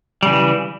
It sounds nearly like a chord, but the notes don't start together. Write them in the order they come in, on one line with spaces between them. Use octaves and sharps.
G3 C#3 E3